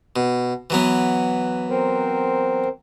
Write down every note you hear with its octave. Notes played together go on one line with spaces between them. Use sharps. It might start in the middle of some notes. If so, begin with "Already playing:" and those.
B2
E3 F#3 B3
C4 A#4 C5